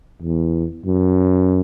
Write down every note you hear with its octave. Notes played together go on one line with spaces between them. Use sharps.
E2
F#2